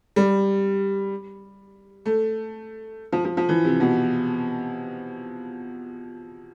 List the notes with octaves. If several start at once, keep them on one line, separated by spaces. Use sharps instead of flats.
G3
A3
F3
F3
F3
E3
C3
B2